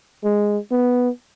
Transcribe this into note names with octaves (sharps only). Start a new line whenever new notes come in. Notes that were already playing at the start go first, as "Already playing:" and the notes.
G#3
B3